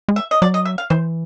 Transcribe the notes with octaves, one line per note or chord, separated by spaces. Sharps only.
G#3
E5
D#5
F#3 D5
D#5
E5
F5
E3 C5